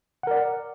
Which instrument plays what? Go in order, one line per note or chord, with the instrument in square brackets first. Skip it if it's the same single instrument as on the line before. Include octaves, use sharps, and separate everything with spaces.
[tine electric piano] F#5
A#4
D5